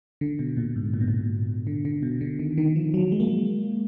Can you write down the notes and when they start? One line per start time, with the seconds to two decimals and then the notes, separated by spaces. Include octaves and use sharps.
0.21 D3
0.39 B2
0.57 A#2
0.76 G#2
0.94 A#2
1.01 B2
1.08 A#2
1.67 D3
1.85 D3
2.03 B2
2.21 D3
2.39 D#3
2.58 D#3
2.76 F3
2.94 F#3
3.12 G#3
3.20 A#3
3.28 G#3